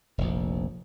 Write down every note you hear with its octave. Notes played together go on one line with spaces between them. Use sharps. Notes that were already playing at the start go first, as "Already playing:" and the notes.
F1 A#1